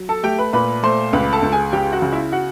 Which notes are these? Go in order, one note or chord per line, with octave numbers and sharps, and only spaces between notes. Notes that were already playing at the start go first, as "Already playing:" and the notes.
Already playing: F#3
A4 A5
A3 G4 G5
B4 B5
A#2 B4 B5
A3 C5 C6
C#2 B4 B5
A4 A5
C#2
G#4 G#5
C#3 G4 G5
F#4 F#5
C#3
E4 E5
F#4 F#5